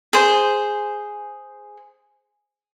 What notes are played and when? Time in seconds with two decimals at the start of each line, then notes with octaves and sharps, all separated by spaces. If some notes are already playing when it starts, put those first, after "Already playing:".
0.13 G#4 C5